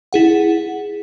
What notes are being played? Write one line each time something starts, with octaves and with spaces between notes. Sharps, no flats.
E4 G#4 F#5